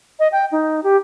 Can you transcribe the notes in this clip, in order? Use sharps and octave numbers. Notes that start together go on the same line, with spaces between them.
D#5
G5
D#4
G4